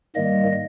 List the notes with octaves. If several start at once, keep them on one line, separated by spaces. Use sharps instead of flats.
G#2 D#3 G3 A#3 D#5